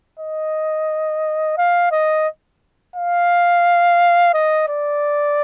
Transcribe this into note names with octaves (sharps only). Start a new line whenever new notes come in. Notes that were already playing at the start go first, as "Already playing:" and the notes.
D#5
F5
D#5
F5
D#5
D5